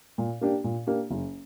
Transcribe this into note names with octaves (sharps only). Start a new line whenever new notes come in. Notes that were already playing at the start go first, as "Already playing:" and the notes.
A#2
A#3 D4 G4
A#2
A#3 D4 G4
F#1